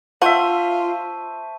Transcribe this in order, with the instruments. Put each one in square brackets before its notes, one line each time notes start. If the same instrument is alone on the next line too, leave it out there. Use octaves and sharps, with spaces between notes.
[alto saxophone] F4 [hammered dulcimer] C5 E5 [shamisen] F#5 [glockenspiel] A5 C#6 D#7